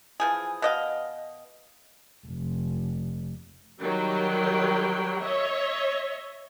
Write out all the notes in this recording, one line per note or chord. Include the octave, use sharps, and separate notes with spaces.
E3 F3 G#4
B2 D#5 F5
F1
D#3 F#3 G3 G5
C#5 D#5 E5